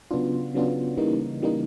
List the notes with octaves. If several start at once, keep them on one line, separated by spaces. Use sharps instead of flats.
C#3 F#3 B3 D4 F4
C#3 F#3 B3 D4 F4
C#3 E3 G3 A#3 D#4
C#3 E3 G3 A#3 D#4